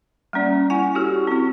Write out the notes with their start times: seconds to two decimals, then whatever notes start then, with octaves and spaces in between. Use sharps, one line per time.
0.33 G3 A#3 C#4 D5
0.70 E4 F#5 G#5
0.95 E4 F#4 G4 A4 C#5
1.27 C4 E4